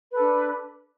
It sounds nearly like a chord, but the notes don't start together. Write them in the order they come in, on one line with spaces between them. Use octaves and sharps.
B4 A4 D4